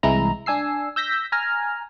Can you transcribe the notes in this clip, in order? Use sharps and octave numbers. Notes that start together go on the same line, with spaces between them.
C2 E3 G#3 E4 A#5
D4 G#5 E6 C7
E6 G6 A#6 B6
G#5 A#5 F6